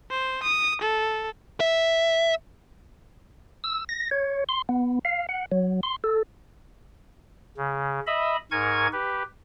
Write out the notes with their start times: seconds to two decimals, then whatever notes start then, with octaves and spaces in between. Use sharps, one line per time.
0.11 C5
0.43 D#6
0.82 A4
1.60 E5
3.64 E6
3.89 A#6
4.11 C#5
4.49 C6
4.69 B3
5.05 F5
5.29 F#5
5.52 F#3
5.83 C6
6.04 A4
7.57 C#3
8.07 D#5 E5 B5
8.51 G#2 A#4 G#5 C#6 G#6
8.93 G4 B4